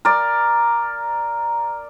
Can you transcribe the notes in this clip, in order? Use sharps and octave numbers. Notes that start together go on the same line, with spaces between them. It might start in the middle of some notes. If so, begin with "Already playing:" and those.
A#4 D5